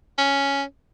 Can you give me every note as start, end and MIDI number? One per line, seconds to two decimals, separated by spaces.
0.18 0.63 61